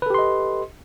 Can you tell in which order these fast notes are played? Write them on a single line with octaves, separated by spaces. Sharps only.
B4 A4 G4 C6 D#5